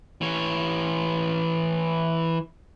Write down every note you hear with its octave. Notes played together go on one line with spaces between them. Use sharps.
E3 C#5